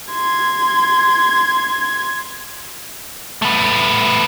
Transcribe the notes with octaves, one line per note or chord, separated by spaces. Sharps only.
C6 G#6
A3 B3